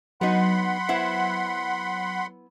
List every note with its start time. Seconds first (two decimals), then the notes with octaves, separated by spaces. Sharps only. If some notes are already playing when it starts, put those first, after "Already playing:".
0.21 F#3 B3 D#4 F#5 B5 C6
0.89 B3 E4 C5